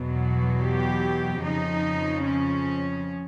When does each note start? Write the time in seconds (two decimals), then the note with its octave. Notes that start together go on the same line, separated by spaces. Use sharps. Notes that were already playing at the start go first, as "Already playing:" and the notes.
Already playing: E2 B2 F#3
0.61 G4
1.42 F2 C#3 F3 D#4
2.24 C#4